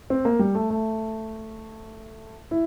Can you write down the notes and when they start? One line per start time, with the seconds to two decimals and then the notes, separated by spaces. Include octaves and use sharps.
0.10 C4
0.25 A#3
0.39 G3
0.55 A3
0.70 A3
2.51 E4